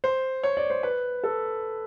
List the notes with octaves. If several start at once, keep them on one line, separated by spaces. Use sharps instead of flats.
C5
C#5
D5
C5
B4
A4